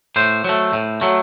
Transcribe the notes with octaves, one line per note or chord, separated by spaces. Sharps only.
A2 C5
F#3 A3
A2
F#3 A3